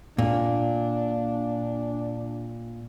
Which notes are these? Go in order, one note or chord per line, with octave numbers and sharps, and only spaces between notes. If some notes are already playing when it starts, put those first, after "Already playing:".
A#2 D4